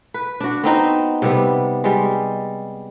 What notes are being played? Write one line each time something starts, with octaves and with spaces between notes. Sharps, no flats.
B4
D4 F#4
B3 C4 D#4
C3 G3 B3
G3 G#3